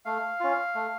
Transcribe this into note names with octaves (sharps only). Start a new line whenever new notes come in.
A3 F5
C#4 F4
A3